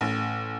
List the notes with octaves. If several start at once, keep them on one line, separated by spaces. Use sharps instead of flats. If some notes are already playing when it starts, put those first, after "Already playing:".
A1